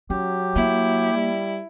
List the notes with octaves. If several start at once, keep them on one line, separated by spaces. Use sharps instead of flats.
F#3 C#4 G4
A#3 E4
G3